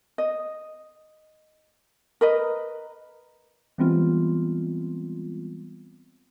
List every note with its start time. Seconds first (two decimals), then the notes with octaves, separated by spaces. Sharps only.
0.18 D#5
2.21 A#4 B4 D#5
3.78 E3 G3 G#3 B3 C4 F4